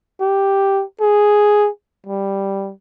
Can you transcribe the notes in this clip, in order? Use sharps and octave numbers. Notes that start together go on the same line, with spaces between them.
G4
G#4
G3